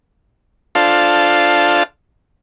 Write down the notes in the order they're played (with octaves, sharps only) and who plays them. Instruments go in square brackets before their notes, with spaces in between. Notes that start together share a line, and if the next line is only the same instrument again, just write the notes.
[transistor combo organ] D4 F4 A4 C5 F5 A5